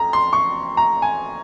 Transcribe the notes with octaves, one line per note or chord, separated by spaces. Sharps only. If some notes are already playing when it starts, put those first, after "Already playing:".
Already playing: F2 A#5
C6
C#6
A#5
G#5